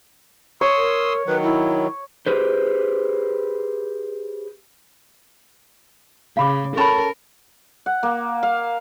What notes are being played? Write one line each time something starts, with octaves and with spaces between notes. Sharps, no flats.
C#5 C6 D#6 E6
A#4
D#3 F#3 B4
E4
G4 G#4 B4 C5
C#3 F5 B5 D6
C#4 A4 A#4 C#5 B5
F#5
A#3
F5